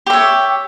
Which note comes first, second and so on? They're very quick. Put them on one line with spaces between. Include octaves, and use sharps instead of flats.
G4 E5 C#5